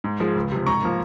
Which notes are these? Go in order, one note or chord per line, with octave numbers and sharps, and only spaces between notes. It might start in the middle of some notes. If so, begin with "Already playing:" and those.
G#2
F3 G#3
C#2
C3 F3
G#2 A#5 C#6
F3 A#3